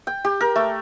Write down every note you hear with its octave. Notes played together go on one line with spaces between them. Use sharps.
G5
G4
A#4
A3